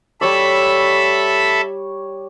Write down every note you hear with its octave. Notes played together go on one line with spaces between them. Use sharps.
G3 A4 C#5 E5 B5 D6